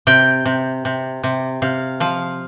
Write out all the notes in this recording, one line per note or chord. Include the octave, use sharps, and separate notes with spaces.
C3 G5
C3
C3
C3
C3 F5
F3 F5